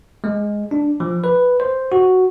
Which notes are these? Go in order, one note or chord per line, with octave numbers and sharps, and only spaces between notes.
G#3
D4
F3
B4
C5
F#4